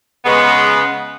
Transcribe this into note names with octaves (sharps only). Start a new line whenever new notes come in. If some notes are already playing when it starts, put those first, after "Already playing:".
C#3 G#3 B3